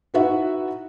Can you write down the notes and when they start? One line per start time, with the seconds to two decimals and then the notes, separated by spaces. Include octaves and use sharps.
0.14 D#4 E4 F#4 B4 E5 F#5